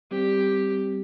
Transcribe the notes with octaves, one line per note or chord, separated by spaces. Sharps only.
G3 C4 G4